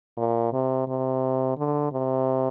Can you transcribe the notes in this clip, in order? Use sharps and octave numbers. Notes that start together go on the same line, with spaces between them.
A#2
C3
C3
D3
C3